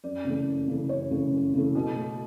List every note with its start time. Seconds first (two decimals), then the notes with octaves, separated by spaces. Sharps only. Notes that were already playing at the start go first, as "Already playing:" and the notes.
0.04 F#2 D5
0.25 C#3 E3 A3
0.47 F#2
0.68 C#3 E3 A3
0.89 F#2 C#5
1.11 C#3 E3 A3
1.32 F#2
1.54 C#3 E3 A3
1.75 B2
1.96 A3